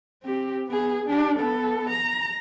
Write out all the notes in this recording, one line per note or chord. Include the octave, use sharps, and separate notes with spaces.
C4 G4
B3 G#4
D4 G4
B3 A4
A#5